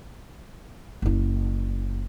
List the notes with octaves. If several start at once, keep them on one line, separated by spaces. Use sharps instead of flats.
F#1 E4